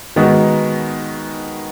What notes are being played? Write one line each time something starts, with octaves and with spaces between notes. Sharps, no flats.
D#3 G#3 B3 D#4 F#4